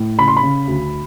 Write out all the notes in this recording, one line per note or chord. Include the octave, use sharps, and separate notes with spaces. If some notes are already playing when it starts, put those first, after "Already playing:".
Already playing: A2
C#3 B5
C6
B5
C#3
D2